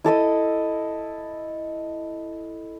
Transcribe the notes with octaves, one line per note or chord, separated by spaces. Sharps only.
E4 A4 D#5 D#6